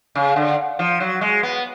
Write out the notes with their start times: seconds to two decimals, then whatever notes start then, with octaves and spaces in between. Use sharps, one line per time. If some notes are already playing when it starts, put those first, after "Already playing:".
0.15 C#3
0.36 D3
0.79 F3
1.00 F#3
1.21 G#3
1.43 B3